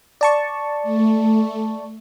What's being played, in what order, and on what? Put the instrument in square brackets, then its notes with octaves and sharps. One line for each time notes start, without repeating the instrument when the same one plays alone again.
[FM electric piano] D5 A5 C#6
[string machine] A3